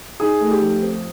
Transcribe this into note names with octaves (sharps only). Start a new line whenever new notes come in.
D#4 G#4
A3
G4
F3
C4